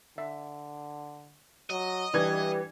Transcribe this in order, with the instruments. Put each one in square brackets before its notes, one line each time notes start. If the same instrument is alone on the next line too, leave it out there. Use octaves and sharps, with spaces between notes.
[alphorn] D3 [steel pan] E5
[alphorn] F#3 [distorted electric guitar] D#5
[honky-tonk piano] E3 G#6 [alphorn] G3 [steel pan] D4